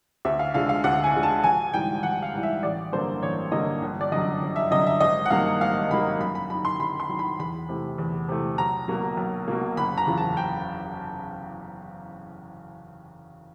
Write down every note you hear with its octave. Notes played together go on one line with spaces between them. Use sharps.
D2 E5
F5
D3 F3 G#3 F5
F5
D2 F#5
G#5
D3 F3 G#3
A5
A#1 G#5
G#2 E3 G3 G5
A#1 F#5
F5
G#2 E3 G3
E5
A1 D5
G2 D3 F#3 A#3 C5
A1 C#5
G2 D3 F#3 A#3 D#5
G1
D5
F#2 D3 F#3 D#5
G1
E5
F#2 D3 F#3 D#5
E5
G#1 D#5
F#5
G2 D#3 F#3 A#3 F5
G#1 F5
G2 D#3 F#3 A#3 B5
F#2 B5
B5
D#3 F#3 B5
C6
F#2 B5
C6
D#3 F#3
B5
E2 B5
C3 E3 A3
E2
C3 E3 A3
B1 A#5
B2 F#3 A#3
B1
B2 F#3 A#3
F#1 B5
A#5
E2 C#3 F3
A5
G5